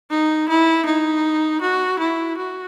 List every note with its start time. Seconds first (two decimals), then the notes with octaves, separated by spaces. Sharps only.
0.10 D#4
0.49 E4
0.86 D#4
1.61 F#4
1.99 E4
2.37 F#4